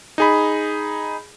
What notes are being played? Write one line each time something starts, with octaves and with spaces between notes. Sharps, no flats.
D#4 G#4 B5